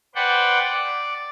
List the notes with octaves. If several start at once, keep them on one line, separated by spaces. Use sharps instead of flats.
B4 C5 D5 F#5 G5
D5